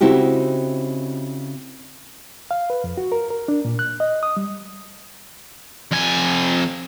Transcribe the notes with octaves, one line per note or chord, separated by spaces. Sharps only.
C#3 C4 D#4 E4 F#4 G4
F5
B4
F2
F#4
A#4
A#4
D4
A#2
F#6
D#5
D#6
G3
F2 G#5